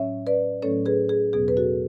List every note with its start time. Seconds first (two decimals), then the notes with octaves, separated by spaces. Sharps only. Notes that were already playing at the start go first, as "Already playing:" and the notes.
Already playing: A2 F#3 C#4 C#5 E5
0.27 B4 D5
0.62 A2 F#3 A3 C#4 A4 C#5
0.86 G#4 B4
1.09 G#4
1.33 E2 B2 F#3 B3 G#4
1.48 B4
1.57 F#4 A4